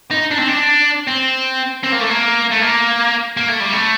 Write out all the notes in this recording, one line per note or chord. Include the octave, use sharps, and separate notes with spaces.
D#4
D4
C4
D4
C4
C4
A#3
A3
A#3
A3
A#3
A#3
A3
G3
A3